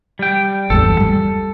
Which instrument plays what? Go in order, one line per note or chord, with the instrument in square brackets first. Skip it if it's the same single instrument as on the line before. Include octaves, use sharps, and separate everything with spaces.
[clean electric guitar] G3 G5
[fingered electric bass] G#1 E2 G2 [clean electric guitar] A4
[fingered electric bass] G3